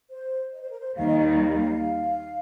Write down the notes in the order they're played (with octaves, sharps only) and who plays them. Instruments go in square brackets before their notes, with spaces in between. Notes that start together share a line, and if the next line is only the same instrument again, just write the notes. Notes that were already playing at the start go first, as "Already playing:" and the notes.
[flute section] C5
D#5
C5
A#4
C5
[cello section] D#2 D#3 G3 [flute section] F5
[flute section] D#5
F5